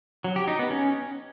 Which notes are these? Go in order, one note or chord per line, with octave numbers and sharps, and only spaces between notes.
F#3
G4
D#4
B3
C#4